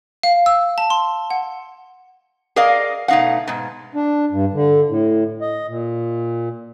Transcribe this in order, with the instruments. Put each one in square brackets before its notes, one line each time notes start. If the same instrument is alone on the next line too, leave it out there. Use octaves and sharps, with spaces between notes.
[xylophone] F5
E6
A5
C6
F#5
[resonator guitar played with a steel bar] G#4 A#4 D5 D#5 F5
B2 A3 D#4 F5 F#5
G#2 B2
[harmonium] D4
G2
D3
A2
D#5
A#2